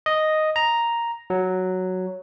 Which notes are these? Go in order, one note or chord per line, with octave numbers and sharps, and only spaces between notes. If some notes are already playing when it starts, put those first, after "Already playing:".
D#5
A#5
F#3